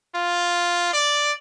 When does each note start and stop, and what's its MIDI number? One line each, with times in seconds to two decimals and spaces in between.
0.15 0.91 65
0.93 1.32 74